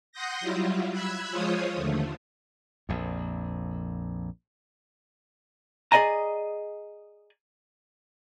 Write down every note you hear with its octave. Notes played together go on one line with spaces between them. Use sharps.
F#5 C6 D#6 G6 A#6
F#3 G3 E4 F4
B5 E6 F#6 G#6
F3 G#3 F4 C5 C#5 D#6
D#2 D3 A3
A#1 F2
G#4 A4 D5 D#5 G#5 A#5